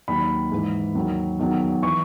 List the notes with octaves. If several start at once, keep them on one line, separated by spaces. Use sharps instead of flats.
D#2 D#3 F#3 B5
G#2 E3
D#2 D#3 F#3
E2 D#3 F#3
E3 C#6